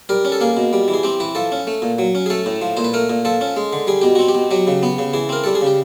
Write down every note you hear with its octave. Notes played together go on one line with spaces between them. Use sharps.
G3 A#4
C#4
A4
A#3 G#4
B2
G3
E3
G#4
C4 G4
E3 B4
F3 A4
C#4
A3
A#2
F#3
C#4
G#4
A3 A4
A2
F3
A#2 C5
B4
A3 A#4
A#2
F3 A4
C#4
G#3
D3
G3 G#4
B2 G4
C4 F#4
G4
B2
F#3 G4
C#3
B3
C#3
E3 G#4
C4 A#4
G3 A4
G#4
C#3
G4